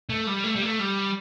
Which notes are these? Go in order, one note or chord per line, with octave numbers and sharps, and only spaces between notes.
A3
G3
A3
G3
A3
G3